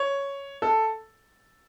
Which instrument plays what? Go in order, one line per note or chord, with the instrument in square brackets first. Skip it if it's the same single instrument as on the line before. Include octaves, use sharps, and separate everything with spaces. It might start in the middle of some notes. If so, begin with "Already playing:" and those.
Already playing: [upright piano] C#5
A4